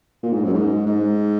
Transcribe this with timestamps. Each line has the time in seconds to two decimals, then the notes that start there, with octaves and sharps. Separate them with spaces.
0.23 A#2
0.33 G#2
0.44 F#2
0.54 G#2
0.86 G#2